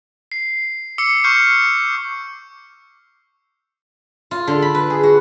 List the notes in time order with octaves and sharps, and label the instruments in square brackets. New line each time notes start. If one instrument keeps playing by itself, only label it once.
[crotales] C7
D6 E6 C7 C#7
C#6 F6 G6 C7 C#7
[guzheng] F4
D3
B5
B4
G#4
F#4